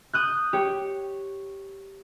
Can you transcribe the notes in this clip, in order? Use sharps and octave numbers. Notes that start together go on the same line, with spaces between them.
D#6 F#6 G6
G4 C#5